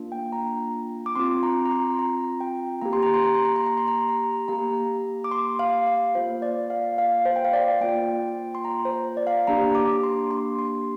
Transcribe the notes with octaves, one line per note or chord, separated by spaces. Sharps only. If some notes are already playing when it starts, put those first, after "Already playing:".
Already playing: A#3 D4 F4
G5
A#5
D6
C4 F4 C6
A#5
A#5
C6
A#5
G5
A#3 G4 A#5
C6
A#5
C6
A#5
C6
A#5
C6
A#5
C6
A#5
C6
A#5
A#3 G4 A#5
D6
C6
F5
F5
A#3 F4 C5
D5
F5
F5
C5
G5
F5
D5
A#3 F4 G5
C6
A#5
C5
D5
F5
A#3 D4 G4 A#5
D6
C6
C6
C6